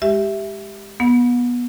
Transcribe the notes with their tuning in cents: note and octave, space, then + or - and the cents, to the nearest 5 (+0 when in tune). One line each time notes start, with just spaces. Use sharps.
G#3 +0 G4 +0 E5 +0
B3 -20 F#5 -45